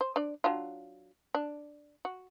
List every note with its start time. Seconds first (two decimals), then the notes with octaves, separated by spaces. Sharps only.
0.01 C5
0.16 D4 D5
0.44 F#3 D4 F4
1.35 D4
2.05 F#4